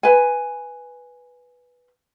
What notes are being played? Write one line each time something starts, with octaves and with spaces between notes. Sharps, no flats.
B4 G#5